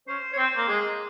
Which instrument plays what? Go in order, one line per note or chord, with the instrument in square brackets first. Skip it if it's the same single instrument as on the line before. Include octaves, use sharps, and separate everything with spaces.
[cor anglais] C#4 [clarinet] C5
[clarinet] C#5
[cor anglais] C4 [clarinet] C5
[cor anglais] A#3
[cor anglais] G#3 [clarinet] G#4